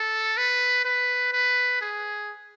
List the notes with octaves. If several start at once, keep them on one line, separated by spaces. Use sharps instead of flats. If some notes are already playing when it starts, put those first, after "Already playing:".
Already playing: A4
B4
B4
B4
G#4